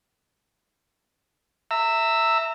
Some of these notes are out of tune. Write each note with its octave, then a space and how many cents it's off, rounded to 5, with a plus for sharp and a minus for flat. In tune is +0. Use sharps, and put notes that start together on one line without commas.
E5 +0 A#5 -30 E6 +0